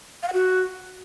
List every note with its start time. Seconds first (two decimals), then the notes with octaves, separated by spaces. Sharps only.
0.23 F5
0.28 F#5
0.33 F#4